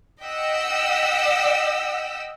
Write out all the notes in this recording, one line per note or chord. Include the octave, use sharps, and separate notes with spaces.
D#5 F#5 G5 E6 B6